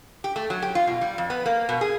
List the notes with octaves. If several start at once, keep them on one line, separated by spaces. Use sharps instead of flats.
G4
A3
F#3
G4
F4
B2
G3
F2
B3
A#3
B2
G#4